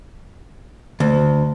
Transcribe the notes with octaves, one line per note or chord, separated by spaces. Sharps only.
D2